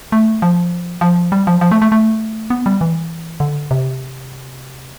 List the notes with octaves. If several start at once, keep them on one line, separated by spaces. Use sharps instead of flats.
A3
F3
F3
G3
F3
F3
A3
A3
A3
B3
G3
E3
D3
C3